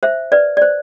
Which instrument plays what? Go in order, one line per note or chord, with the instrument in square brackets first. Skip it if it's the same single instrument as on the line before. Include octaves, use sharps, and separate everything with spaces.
[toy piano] C5 E5
B4 D5
D5
C5